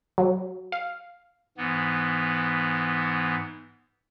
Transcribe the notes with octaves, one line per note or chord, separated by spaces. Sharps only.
F#3
F5
G#2 E3 B3